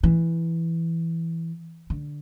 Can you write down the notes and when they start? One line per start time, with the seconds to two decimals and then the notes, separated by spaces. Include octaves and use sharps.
0.03 E3
1.90 D3